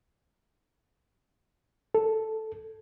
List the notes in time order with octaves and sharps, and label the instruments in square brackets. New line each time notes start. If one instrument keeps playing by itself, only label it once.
[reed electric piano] A4